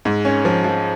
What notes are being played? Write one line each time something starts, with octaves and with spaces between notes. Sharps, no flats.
G#2
C#4
F3
F3